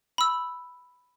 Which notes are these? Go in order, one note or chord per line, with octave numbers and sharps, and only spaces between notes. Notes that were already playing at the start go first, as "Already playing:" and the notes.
B5 E6